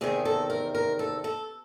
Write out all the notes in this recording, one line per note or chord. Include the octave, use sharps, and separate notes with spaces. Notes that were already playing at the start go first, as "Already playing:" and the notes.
E2 C3 D#3 G#4
A4
A#4
A#4
A4
A4